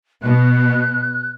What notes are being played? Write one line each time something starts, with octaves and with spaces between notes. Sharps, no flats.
B2 F#6